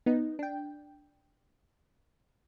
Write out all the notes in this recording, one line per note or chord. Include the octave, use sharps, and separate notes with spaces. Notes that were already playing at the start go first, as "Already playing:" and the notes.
B3 D#4
D4 G5